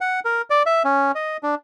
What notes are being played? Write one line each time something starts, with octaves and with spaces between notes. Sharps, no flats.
F#5
A#4
D5
E5
C#4
D#5
D4